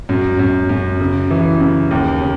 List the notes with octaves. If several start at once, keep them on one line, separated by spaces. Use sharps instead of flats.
F#2
F#2
F#2
C#3
E3
C#3
D#2
C#3